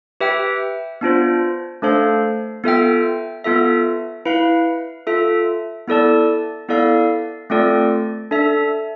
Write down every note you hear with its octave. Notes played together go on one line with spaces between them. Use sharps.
G4 B4 E5 G5
B3 D4 F4 C5
A3 D4 A4 C5 F5
B3 F4 A4 E5 G5
B3 F4 A4 E5
E4 B4 F5
F4 A4 E5
B3 E4 A4 D5 A5
B3 E4 A4 D5 F5
A3 C4 F4 A4 D5
D4 A4 E5